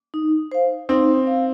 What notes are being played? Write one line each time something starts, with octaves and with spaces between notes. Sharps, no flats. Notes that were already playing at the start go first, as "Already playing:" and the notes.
D#4
C5 F5
C4 D#4
C5 F5